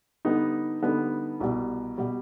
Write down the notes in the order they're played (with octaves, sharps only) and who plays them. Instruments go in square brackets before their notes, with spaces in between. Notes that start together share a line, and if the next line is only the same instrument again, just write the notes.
[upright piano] D3 G3 B3 D#4
D3 G3 B3 D#4
C2 B2 G3
B2 G3